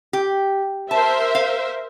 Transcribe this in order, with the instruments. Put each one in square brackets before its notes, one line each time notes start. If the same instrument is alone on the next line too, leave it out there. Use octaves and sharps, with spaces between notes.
[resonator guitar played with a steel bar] G4
[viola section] A#4 C5 E5 [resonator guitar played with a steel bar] A5
[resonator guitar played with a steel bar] F5